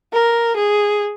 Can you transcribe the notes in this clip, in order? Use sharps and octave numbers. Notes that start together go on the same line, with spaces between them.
A#4
G#4